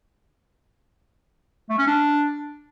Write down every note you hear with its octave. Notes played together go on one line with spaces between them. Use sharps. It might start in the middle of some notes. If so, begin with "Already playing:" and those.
A3
C#4
D4